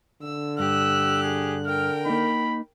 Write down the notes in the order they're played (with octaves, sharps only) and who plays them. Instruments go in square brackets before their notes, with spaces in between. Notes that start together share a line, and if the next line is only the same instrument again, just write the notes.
[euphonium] D3 [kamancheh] E6
[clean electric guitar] G2 [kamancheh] G4 F#6 [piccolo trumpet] E6
[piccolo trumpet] G#4
[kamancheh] A#4 G5 [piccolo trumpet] F6
[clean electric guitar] A#3 D#4 [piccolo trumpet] B5